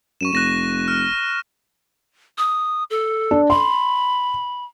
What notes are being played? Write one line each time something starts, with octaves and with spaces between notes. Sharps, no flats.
F#2 C#6 D#7 E7
F1 F#6 A#6 E7
F6
D#6
A4
D4
B5 C6